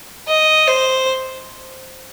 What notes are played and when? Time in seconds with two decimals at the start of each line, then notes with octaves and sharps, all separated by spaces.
0.28 D#5
0.67 C5